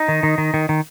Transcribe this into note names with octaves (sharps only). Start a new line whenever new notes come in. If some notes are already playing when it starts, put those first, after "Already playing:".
Already playing: D#4
D#3
D#3
D#3
D#3
D#3